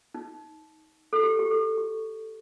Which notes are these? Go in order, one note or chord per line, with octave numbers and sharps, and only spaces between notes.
D#4
A4
G4
G4
A4
G4